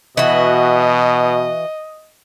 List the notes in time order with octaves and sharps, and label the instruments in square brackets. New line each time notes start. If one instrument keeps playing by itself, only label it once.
[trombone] B2 [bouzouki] E3 F#4 [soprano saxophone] D#5